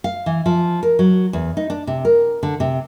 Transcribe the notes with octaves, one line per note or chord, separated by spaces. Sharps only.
F5
E3
F3
A#4
F#3
E2
D#4
D4
C3
A#4
D3
C3